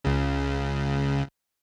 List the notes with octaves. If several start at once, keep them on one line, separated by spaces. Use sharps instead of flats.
C#2 C#3